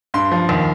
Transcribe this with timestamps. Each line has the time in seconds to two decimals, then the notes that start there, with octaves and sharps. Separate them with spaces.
0.14 G2 C6
0.31 F3
0.49 D#2